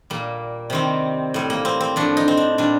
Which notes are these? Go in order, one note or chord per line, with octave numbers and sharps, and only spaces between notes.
A#2 G3 A#3
C3 D#3 G3 C4
A2 G3
A#3
C4
C4
A2 F3 D4
D#4
C4
D4
A#2 G3 D4